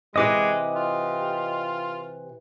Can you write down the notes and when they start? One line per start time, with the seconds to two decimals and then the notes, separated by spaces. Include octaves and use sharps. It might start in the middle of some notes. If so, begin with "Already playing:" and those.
0.16 C3 E3 G#3 G4 B4 D#5 D6
0.76 F4